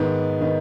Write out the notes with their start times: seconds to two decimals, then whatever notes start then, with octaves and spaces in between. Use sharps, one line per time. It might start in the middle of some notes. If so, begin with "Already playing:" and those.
Already playing: G#2 D#3 B3
0.40 D#3 B3